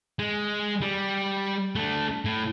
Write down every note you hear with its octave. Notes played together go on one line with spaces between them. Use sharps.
G#3
G3
A3 D4
A2